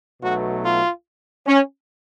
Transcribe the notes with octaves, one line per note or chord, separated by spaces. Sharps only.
B1 B2 F#3 A3 F#4
F4
C#4